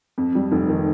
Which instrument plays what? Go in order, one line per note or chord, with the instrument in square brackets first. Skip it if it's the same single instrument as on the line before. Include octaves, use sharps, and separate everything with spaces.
[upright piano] F2
G3
F1
D#3